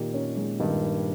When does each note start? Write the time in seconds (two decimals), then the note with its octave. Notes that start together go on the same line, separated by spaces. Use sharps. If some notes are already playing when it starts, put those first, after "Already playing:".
Already playing: A#2 D#3 G4
0.14 C#4
0.36 G#3
0.60 G2 D#3
0.82 G4